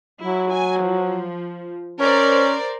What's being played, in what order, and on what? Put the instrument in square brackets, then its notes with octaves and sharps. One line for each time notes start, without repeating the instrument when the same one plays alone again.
[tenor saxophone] F#3 [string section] E4
[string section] G#5
F3
[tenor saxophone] C#4 [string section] A#4 C5 D5